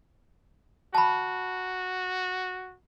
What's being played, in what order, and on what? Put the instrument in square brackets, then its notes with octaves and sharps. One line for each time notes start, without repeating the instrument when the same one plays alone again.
[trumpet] F#4 [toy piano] A5 B5